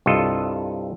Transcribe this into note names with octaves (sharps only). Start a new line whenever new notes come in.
C2 G2 F4 A4 D#5